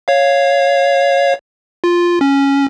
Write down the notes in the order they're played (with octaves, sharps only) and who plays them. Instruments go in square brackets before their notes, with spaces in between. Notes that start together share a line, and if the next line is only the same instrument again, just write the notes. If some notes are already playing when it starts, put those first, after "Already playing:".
[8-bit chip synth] C#5 F5
F4
C#4